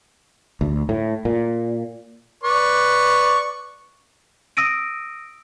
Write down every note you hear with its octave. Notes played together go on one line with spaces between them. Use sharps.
D2
A2
A#2
B4 D5 C#6
D#6 E6 A#6 D7 D#7